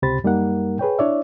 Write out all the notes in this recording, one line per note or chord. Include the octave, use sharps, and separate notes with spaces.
C#2 C3 G4 C5 B5 A6
F#2 G3 A#3 D#4 A#4 F#5
G#4 B4 C#5 G5
D4 E4 C#5 D5 E5